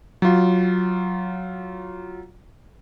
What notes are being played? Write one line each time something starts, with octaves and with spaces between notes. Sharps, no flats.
F#3 F4